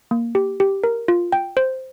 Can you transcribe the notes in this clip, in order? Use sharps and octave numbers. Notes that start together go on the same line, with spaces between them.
A#3
G4
G4
A#4
F4
G5
C5